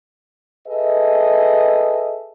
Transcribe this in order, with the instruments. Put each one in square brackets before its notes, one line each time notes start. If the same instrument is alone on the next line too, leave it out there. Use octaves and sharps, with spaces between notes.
[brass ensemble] G#4 A4 B4 D#5 E5